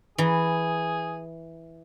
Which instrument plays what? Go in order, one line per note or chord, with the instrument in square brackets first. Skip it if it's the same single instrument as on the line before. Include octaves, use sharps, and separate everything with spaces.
[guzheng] E3 A#5 [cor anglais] G#4